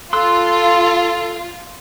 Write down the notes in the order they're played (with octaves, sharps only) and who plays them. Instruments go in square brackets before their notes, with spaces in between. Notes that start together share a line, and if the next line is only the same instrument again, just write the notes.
[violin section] F4 [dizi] A4 [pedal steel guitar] C6 E6 F#6